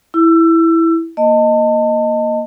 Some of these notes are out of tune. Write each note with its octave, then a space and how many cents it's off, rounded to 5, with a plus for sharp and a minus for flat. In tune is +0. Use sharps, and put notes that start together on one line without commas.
E4 +0 E6 +25
A#3 +0 D#5 +0 A5 +25